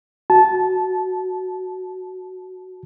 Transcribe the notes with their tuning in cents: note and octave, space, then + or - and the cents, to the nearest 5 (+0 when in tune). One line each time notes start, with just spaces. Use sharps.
F#4 +0 A5 -15